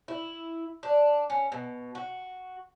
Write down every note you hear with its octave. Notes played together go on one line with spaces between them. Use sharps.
E4
D4
C#4
B2
F#4